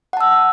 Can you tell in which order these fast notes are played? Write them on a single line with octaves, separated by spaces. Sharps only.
F#5 A5 E6